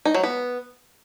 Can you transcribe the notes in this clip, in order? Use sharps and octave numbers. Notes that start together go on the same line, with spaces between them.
D#4
F#3
B3